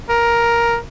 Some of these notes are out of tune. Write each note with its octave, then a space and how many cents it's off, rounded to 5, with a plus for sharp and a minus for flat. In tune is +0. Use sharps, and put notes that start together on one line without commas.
A#4 +10